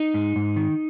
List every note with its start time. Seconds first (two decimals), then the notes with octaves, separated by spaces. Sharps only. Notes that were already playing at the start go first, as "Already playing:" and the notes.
Already playing: D#4
0.14 G#2
0.36 G#2
0.56 D#3